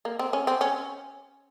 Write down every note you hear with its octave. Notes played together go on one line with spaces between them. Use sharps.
A#3
C4
C#4
C4
C#4